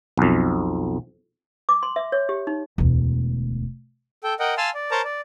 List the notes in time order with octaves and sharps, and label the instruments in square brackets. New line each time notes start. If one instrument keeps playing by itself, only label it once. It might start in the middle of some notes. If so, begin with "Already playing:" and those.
[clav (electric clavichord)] B1 F2
[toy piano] D6
C6
E5
C#5
G4
D#4
[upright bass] E1 D2
[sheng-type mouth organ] A4 G5
A#4 D#5 F#5 G5
F5 G#5 A5 C6 E6 F6
D5
A#4 C5 C#5 A5 A#5
D5